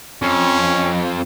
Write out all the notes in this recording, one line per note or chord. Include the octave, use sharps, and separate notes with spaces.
F2 C#4